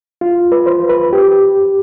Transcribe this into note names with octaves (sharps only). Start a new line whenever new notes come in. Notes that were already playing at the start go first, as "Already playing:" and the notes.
F4
B4
C5
B4
G4